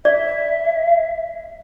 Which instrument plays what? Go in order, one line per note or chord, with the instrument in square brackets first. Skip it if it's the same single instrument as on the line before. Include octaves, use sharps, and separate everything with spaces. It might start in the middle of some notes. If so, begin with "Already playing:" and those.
[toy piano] D5 [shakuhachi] E5